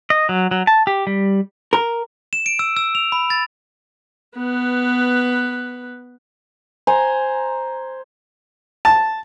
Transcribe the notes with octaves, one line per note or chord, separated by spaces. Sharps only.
D#5
F#3
F#3
A5
G4
G3
A#4
E7
D7
E6
E6
F7
B5
A6
B3 B4
C5 G#5 A#5
A5